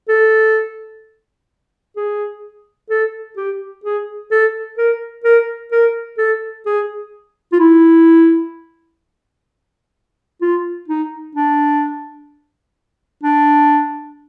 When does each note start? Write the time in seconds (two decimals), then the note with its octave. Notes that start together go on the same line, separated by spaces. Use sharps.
0.09 A4
1.96 G#4
2.90 A4
3.37 G4
3.84 G#4
4.31 A4
4.78 A#4
5.24 A#4
5.72 A#4
6.18 A4
6.66 G#4
7.52 F4
7.59 E4
10.42 F4
10.88 D#4
11.35 D4
13.23 D4